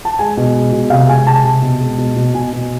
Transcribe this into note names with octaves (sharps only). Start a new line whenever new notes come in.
A5
G#3 G#5
B2
G#3
B2
C3 F5
G#3 G#5
C3 A5
C3
B2
G#3
B2
B2
B2 G#5
B2